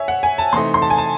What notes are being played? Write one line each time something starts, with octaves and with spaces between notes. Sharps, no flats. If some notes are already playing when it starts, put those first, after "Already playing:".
Already playing: C#5 E5 G#5
F#5
G#5
A5
C3 E3 A3 D#4 C6
C6
A5
G#5
A5